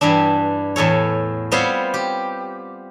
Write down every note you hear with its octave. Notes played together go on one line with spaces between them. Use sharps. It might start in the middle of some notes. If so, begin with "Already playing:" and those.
G2 E3 G3 D4
E2 A2 A4 C#5
G3 B3 C4 F4 C5 C#5
G4